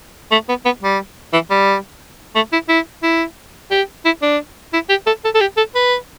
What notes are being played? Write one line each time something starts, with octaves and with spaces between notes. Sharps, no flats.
A3
B3
B3
G3
E3
G3
A3
E4
E4
E4
G4
E4
D4
E4
G4
A4
A4
A4
G4
A4
B4